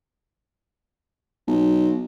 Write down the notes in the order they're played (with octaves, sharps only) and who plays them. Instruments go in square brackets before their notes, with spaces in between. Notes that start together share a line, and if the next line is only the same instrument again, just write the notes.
[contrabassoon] B1